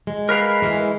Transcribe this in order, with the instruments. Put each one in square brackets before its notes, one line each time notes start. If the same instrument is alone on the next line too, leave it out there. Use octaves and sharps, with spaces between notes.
[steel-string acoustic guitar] G#3
[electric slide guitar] A#4 B4 F5
[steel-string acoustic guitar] E3 G#3